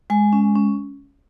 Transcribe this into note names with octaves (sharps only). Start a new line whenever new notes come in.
G#3 G#5
C#4
C#4